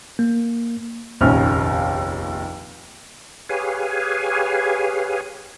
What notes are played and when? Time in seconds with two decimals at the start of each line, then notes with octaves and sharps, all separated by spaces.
0.19 A#3
1.21 F1 A#1 D#2 C#4 F6
3.49 G4 G#4 B4 C#5 F5 G#5